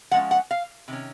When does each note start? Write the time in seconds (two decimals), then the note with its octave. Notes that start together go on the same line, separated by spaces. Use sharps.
0.11 F3 G#3 C#4 F#5
0.31 F#5
0.51 F5
0.88 C3 D#3 C#4